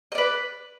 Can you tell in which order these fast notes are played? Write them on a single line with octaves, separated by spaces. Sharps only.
D#5 D5 B4